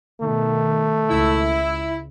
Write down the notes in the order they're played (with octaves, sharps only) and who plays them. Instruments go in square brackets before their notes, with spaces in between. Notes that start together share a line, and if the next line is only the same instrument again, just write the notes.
[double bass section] B2 D#3 [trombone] A3
[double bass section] C#2 [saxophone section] E4